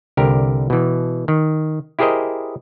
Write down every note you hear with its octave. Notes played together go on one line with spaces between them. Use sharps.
C2 D3 G4 A#4
B2 E3
D#3
E4 G4 G#4 A#4 C5 D#5